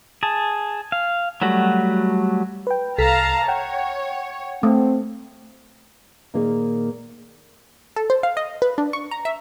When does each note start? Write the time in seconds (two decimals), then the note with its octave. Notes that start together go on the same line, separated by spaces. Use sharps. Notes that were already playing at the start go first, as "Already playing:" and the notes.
0.23 G#4 A5
0.92 F5
1.42 F#3 G3 A3 F#4
2.67 B4 G5
2.98 C2 A4 F5 A5 A#5 B6
3.48 C#5 F#5 G5
4.63 A3 C4
6.34 A#2 D#3 A#3 D#4 G#4 C5
7.96 A4
8.10 C5
8.23 F5
8.37 D#5
8.62 B4
8.78 D4
8.93 C#6
9.11 A#5
9.25 E5